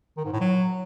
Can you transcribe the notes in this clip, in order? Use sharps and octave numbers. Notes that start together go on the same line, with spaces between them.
D#3
G#2
A2
F#3